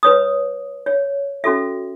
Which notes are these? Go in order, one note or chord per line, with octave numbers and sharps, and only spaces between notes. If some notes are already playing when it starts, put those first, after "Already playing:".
B4 C#5 D#6
C#5
C#4 F#4 A4 E5